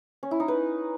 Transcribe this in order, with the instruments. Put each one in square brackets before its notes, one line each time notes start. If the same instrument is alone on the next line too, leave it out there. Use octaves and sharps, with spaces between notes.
[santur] C#4
E4
D#4
B4